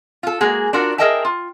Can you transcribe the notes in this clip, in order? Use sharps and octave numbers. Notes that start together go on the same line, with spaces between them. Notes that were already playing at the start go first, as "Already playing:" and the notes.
F4 A4
G#3 A#3 F#4 G#4
D4 F4 F#4 A#4
G#4 A#4 D#5 E5 G5 A5
F4